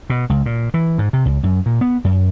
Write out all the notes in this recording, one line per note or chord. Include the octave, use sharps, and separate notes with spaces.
B2
C#2
A#2
E3
G#2
C3
C#2
F#2
A#2
B3
F#2